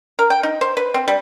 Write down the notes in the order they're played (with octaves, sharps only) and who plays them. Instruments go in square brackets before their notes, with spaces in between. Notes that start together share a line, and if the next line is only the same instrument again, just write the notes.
[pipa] A#4
G5
D#4
C5
B4
C4
G3